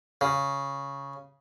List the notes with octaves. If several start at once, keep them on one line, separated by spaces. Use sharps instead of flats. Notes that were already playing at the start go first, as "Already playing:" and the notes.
C#3